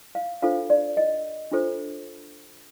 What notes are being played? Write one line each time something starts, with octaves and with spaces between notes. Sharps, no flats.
F5
D4 F4 A4 C5 F5
D5
D#5
D4 F4 A4 C5